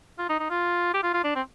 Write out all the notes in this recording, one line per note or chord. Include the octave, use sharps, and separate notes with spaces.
F4
D#4
D#4
F4
G4
F4
F4
D4
C4